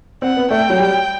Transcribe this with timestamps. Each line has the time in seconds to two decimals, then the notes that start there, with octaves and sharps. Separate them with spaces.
0.22 C4 F#5
0.37 B3
0.50 A3 G5
0.70 F#3
0.79 G3